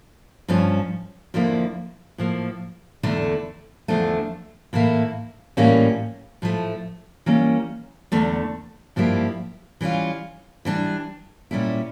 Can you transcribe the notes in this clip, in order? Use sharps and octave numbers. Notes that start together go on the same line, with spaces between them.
G2 F3 C#4
F2 D3 F3 A#3 E4
A2 F3 A#3
E2 D3 A3 E4
E2 D3 F3 A3 D4
A2 E3 A#3 E4
A2 E3 G3 A#3 C#4
A2 F3 A3
E3 G3 A#3 C#4
E2 D3 A3
G2 F3 A#3 E4 G4
E3 G3 C#4 F4
E3 G3 D4
A#2 G3 C#4 E4 G4